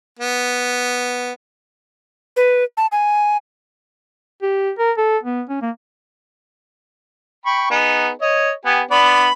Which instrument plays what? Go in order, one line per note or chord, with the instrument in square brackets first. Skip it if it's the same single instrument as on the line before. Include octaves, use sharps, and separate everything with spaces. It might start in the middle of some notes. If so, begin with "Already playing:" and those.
[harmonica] B3
[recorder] B4
A5
G#5
[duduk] G4
A#4
A4
B3
C#4
A#3
[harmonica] G5 B5 C#6
B3 D#4 G#4
C#5 D#5
B3 G4 G#5
[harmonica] B3 D4 D5 [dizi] B5